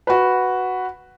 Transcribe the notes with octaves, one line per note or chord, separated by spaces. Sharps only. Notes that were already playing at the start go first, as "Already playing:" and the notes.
F#4 B4